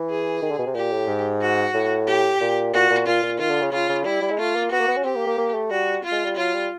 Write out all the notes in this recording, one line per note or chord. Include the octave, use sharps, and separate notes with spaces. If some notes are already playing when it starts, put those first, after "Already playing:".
Already playing: E3
G#4
D#3
D3
B2
C3
A#2 G4
A2
G#2
F#4
A2
G4
A#2
A#2 F#4
A#2
A#2 F4
A#2
D#3 F4
D3
C#3
C#3 F4
C#3
G3 E4
G3
G#3
A3 F4
A#3
B3 F#4
A#3
B3
C#4
C4 G4
A#3
A#3
A#3
A3
G3 F#4
F4
G#3
G3
F#3 F4
G3